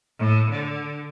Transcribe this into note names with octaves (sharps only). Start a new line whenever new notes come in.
A2
D3